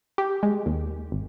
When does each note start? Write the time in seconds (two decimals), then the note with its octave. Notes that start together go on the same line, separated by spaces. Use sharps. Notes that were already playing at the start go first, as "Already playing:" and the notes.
0.18 G4
0.43 G#3
0.66 D#2
1.12 G#1